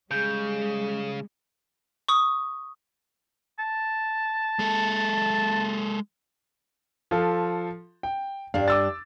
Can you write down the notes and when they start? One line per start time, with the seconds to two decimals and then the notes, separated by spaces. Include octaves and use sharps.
0.11 C#3 G3 G#3 G#4 G6
2.08 C#6 D#6
3.59 A5
4.59 G#3 A4
7.11 F3 F4 A4
8.03 G5
8.54 G2 D4 F5
8.68 D6 E6 A6